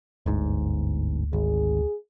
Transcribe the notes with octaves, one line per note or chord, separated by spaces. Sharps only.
G1 D2 G#2
G#1 G#4